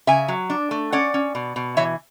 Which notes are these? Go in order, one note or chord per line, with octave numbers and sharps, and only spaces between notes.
C#3 E5 G#5
F#3
D4
A3
C#4 D5 F#5
C#4
B2
B2
E3 C#5 E5